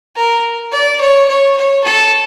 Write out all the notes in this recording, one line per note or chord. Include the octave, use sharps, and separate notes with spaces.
A#4
D5
C#5
C#5
C#5
A4